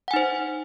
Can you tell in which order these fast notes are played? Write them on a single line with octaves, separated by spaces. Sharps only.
F#5 G#5 D#4 C5